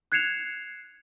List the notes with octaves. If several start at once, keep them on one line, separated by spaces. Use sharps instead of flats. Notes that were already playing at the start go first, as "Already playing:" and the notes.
F#6 G#6 C7 C#7 E7 F7